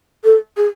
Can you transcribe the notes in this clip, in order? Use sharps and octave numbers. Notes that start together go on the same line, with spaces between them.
A4
G#4